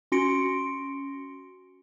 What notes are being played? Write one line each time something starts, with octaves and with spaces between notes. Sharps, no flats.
C#4 F#4 C6 A#6 C#7 D7